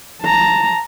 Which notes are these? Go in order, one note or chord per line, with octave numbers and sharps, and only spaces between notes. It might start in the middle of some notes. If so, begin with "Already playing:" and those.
A5 A#5